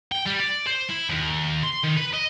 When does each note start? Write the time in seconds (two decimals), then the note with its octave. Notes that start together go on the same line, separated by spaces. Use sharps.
0.12 G5
0.26 G3
0.40 D5
0.67 C5
0.89 E4
1.10 D#2
1.63 C6
1.84 D#3
1.98 B4
2.14 D#5